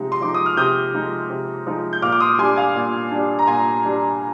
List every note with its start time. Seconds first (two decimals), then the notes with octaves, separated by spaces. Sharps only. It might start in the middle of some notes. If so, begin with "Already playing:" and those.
Already playing: C3 F3 G#3 D#4
0.12 C6
0.21 F3 G#3 D#4 D6
0.34 D#6
0.46 F6
0.57 C3 D#6 G6
0.94 F3 G#3 D#4
1.30 C3
1.66 F3 G#3 D#4
1.93 G6
2.02 A#2 D6 F6
2.12 D6
2.20 C6 D#6
2.39 G3 D4 G#5 C6
2.56 F5 G#5
2.75 A#2
3.11 G3 D4
3.39 A#5
3.47 A#2 G#5 C6
3.84 G3 D4